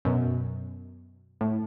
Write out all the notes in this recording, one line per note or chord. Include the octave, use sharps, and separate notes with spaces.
F#2 B2
A2